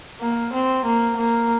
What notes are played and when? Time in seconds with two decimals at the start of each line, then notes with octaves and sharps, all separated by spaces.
0.21 A#3
0.53 C4
0.85 A#3
1.16 A#3